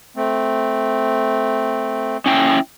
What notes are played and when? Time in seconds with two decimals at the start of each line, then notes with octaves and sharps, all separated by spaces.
0.16 A3 C4
2.26 C#4 E4 G5